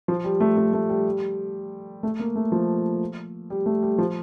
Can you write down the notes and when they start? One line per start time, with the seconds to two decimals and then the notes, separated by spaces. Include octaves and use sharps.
0.08 F3
0.24 G3
0.40 A3
0.57 A3
0.73 A3
0.89 G3
2.03 A3
2.20 A#3
2.36 A3
2.52 F3
3.50 G3
3.66 A3
3.83 G3
3.98 F3